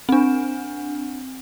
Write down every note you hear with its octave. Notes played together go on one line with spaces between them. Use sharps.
C4 D4